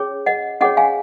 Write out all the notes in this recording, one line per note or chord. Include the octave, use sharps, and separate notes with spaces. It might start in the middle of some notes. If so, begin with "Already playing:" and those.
Already playing: C#4 G#4 C#5
D#5 F#5
C#4 G#4 C#5 D#5 F#5
F5 G#5